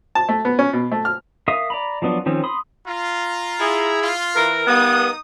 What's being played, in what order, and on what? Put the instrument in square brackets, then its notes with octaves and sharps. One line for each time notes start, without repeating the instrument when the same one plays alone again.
[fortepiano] A5
A3
B3
C#4
B2
A3
F6
[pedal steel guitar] A#4 E5 F5 C#6 D#6
D5 A#5 B5
F3 F#3 B3 D4
D#3 F3 C4 C#4
B5 C6 D#6
[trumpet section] F4 A#5
[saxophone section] E4 G#4
[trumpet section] F4
[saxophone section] E3 A#4
[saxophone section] G3 A#3 B3 [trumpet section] D#4 D#6